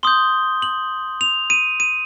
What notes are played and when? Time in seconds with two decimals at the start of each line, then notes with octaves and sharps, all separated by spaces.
0.03 C6 D#6 G6 G7
0.62 F#7
1.21 F7
1.50 D#7
1.80 D#7